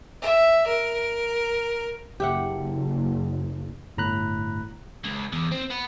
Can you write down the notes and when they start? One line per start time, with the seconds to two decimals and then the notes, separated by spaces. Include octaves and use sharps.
0.22 E5
0.67 A#4
2.20 F#1 G4 E5 F#5
3.98 G1 A2 A#5 B5 F#6
5.04 C#2
5.33 E2
5.52 C4
5.71 B3